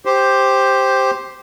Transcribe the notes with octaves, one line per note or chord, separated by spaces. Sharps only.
G4 C5